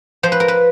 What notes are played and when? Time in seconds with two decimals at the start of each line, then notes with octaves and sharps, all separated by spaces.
0.23 F3 C5
0.32 B4
0.40 A#4
0.48 B4